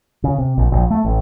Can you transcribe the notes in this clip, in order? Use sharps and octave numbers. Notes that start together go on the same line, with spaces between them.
C#3
C3
A#1
A#1
A3
A1